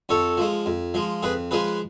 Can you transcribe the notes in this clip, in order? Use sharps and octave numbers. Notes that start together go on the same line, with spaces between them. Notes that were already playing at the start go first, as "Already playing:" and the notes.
F2 A4 C#5
F3 G#3
F2
F3 G#3
F2 G#4 B4
F3 G#3 G#4 B4